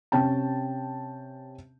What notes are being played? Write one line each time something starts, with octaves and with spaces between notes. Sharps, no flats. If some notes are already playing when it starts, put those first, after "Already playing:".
C3 C#4 G5 A5